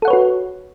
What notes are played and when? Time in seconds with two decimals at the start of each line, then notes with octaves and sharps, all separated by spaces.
0.02 A4
0.05 F#5
0.08 C#5
0.10 B4
0.13 F#4